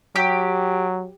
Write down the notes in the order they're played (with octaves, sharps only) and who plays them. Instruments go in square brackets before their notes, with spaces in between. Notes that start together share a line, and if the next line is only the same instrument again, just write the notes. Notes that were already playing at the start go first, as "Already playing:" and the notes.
[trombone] F#3 [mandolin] G4